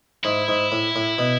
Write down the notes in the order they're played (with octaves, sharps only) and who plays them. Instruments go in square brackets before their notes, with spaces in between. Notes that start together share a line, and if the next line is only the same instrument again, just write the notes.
[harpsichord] G#2 [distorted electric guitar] E4
[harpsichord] G#2
A2
A2
B2